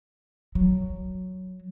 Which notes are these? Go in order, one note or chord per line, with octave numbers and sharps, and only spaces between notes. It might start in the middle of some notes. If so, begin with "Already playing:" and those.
F#3